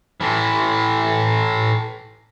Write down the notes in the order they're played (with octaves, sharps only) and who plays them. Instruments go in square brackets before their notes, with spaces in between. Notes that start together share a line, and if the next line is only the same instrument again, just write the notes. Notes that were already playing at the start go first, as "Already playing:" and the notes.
[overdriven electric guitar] A2 E3